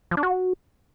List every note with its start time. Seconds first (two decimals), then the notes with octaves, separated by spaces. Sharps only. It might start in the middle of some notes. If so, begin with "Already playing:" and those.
0.11 F3
0.17 D4
0.23 F#4